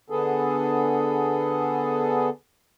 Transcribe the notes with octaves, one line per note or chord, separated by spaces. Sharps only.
D3 B3 G#4 A4